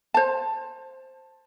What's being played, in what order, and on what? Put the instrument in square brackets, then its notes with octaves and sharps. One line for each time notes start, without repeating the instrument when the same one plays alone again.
[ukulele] C5 A5